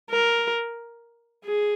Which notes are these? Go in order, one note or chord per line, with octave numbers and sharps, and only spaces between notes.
A#4
G#4